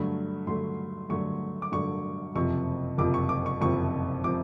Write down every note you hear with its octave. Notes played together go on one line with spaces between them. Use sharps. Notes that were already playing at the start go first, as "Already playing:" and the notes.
Already playing: G2 D3 F#3 A3 B5
G2 D3 F#3 A3 C6
G2 D3 F#3 A3 C#6
D6
G2 D3 F#3 A3 C#6
F#1 F2 C3 F3 C#6
F#1 F2 C3 F3 D6
C#6
D6
C#6
F#1 F2 C3 F3 C#6
C3 F3 D6